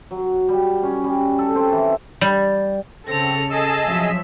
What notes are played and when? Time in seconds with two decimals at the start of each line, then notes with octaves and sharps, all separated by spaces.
0.11 F#3
0.48 G3
0.83 C#4
1.04 G3
1.39 A4
1.55 C4
1.72 E3
2.21 G3
3.07 C#3 C4 A4 A#6 F7
3.51 G#4 D#5 A5 E6
3.87 F3 F#3 E5